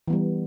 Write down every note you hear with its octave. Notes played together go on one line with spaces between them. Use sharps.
E3 G3 B3